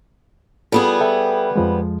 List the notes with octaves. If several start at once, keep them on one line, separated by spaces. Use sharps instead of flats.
G3 B3 F4 G#4 A4
A4 E5 G5
F2 F3 G#3